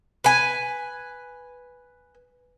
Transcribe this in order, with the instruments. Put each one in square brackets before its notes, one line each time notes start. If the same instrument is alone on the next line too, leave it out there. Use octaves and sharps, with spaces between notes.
[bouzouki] B4 G#5